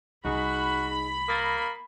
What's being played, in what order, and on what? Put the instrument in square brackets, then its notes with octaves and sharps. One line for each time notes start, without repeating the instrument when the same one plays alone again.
[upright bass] C2 [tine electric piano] D#4 G#4 [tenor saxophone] F#4 [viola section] B5
[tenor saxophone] A#3 [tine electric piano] D#6 A6 A#6